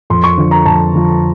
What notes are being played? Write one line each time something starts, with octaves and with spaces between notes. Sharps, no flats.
F2 C6
C#6
D3 F3
A#5
F2 A5
D3 F3